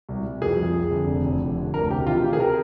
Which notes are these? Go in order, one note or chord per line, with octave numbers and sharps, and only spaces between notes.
C2
C2
F2 G#4
F3
F2
D3
F1
F1
F1
D3
D2 A#4
C3 G4
D#3 F4
C3 G4
G#4
A#4